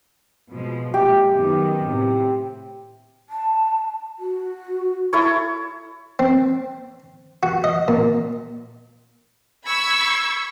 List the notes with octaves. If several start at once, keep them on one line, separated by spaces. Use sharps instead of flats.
B2 F3 G#3
A#2 G#3 G4
F#2 D#3 B3
A2 C3
A5
F#4
E4 A4 C#5
C4
F#4
D#5
A#2
B5 C#6 E6 G#6